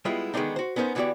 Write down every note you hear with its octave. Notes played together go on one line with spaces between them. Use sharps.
G3 G#3 B3 E4 F4
D3 D#3 G#3 B3 D4 D#4
F#4 C5
B3 C#4 D#4 A#4 C5
D3 E3 B3 F#4 G4 D5